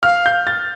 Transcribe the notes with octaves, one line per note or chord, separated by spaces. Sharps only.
F5 F6
G6
A6